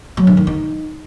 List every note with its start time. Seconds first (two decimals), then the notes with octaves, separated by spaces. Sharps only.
0.17 F#3
0.27 D3
0.37 D#3
0.47 D#4